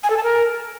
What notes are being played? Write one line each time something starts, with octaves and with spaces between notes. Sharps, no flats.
G#5
A4
A5
A#4